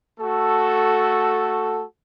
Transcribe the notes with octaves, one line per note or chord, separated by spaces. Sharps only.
A3 F#4 A4